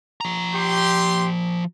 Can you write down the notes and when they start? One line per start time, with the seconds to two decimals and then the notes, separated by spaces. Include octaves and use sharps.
0.21 F3 A#5
0.54 G4 C6